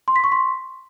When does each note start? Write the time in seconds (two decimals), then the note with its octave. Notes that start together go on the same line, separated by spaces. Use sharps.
0.08 C6
0.16 B6
0.24 C#6
0.32 C6